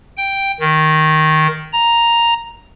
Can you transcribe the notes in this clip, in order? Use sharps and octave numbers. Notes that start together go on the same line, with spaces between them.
G5
D#3
A#5